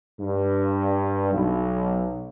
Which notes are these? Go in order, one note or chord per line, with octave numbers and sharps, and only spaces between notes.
G2
B1